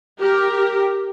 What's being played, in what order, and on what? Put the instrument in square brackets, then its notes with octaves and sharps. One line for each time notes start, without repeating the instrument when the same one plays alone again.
[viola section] G4 A#4